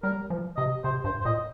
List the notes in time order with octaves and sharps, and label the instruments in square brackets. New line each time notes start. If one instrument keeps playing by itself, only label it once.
[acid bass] G3 [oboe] A#4
[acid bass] F3
[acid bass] C3 [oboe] D#5
[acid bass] C3 [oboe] C5
[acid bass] G2 [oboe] C5
[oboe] C5
[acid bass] A#2 [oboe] D#5